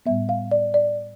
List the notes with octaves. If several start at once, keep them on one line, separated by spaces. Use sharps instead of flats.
A2 G3 B3 E5
F5
D5
D5